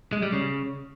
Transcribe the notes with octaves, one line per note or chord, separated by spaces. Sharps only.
G#3
G3
C#3